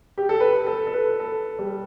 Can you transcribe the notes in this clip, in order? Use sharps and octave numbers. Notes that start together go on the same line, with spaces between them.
G4
A4
B4
A4
A4
B4
A4
G3